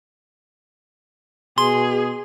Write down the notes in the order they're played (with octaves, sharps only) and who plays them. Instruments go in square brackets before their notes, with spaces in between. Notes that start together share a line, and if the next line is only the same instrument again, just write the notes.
[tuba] B2 [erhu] G#4 [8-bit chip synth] C6